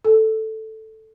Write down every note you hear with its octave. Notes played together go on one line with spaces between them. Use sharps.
A4